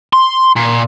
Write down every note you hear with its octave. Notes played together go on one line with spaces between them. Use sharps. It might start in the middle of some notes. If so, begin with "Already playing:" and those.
C6
A#2